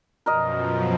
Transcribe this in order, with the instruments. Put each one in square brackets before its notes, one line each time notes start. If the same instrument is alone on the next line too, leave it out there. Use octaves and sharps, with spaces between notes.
[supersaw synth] F#2 B2 F3 [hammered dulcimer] A#4 D#5